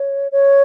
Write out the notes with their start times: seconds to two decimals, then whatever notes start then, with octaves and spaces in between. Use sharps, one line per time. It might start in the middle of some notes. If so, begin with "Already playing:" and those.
Already playing: C#5
0.32 C#5